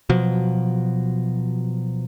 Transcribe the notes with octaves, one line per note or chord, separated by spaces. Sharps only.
B2 F3 F#3